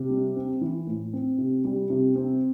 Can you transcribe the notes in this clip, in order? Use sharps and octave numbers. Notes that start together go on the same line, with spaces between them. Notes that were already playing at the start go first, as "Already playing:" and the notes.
Already playing: C3
G3
C4
E3
A2
C4
C3
G3
C3
C4